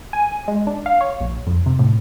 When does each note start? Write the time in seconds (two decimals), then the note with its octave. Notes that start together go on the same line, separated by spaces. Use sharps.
0.13 G#5
0.48 G#3
0.67 D4
0.86 F5
1.01 C#5
1.21 A#1
1.47 F2
1.66 C3
1.79 A2